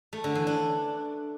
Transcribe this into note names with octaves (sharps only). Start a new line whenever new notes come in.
A3
D3
E3
D4